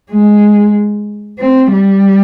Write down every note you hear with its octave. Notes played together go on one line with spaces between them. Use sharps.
G#3
C4
G3